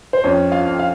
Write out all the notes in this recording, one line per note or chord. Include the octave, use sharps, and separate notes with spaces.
C5
F2 C#4 C#5
F4 F5
F2
F5